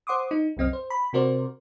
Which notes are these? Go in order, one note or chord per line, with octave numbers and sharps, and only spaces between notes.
C5 F#5 C6 D6 D#6
D#4
C2 F#2 C4 D#5 F6
C5
B5
C3 C4 F#4 A#4 C5 D5